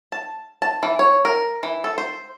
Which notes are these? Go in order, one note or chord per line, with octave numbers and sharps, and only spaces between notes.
A5
A5
E3
C#5
A#4
E3
A4
C5